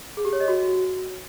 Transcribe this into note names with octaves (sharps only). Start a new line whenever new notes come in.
G#4
G4
C#5
D#5
F#4